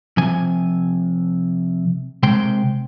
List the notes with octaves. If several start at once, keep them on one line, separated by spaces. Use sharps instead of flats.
C3 F3 G#5
C3 G#3 G5 C6